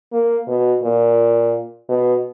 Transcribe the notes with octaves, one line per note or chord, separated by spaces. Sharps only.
A#3
B2
A#2
B2